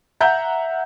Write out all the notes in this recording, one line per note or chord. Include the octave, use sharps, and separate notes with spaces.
E5 F#5 A#5 G6